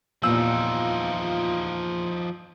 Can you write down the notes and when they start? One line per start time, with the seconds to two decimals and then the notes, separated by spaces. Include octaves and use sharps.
0.23 E2 A#2 F3 D#4 F4 G4 E6